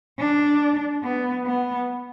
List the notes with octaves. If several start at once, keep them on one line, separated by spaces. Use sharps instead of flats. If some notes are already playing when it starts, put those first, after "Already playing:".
D4
B3
B3